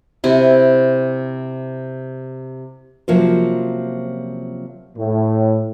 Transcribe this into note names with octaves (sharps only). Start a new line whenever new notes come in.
C3 E4
C3 F3 F#3 A#3 C#4 C5
A2